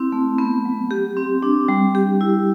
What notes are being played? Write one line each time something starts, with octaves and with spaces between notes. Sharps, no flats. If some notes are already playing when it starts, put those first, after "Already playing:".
Already playing: C4 E4
A3
B3
F#3
G4
C4
D4
G3
G4
E4